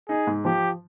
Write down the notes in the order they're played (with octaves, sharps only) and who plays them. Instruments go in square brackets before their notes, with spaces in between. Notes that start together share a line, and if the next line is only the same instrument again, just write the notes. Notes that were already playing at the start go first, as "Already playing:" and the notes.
[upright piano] D#4 [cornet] G#4
[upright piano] G#2
[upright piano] F3 [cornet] G4